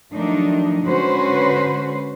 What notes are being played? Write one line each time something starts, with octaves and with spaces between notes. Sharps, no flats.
D#3 F3 F#3 A3 D4 D#4
D3 G#3 C#4 F#4 B4 C5